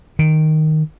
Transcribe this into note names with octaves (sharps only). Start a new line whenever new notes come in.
D#3